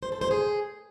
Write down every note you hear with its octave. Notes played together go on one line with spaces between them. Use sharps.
C5
A4
C5
G#4